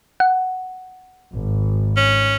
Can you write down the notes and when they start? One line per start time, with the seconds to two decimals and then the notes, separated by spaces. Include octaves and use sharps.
0.20 F#5
1.35 G#1
1.97 C#4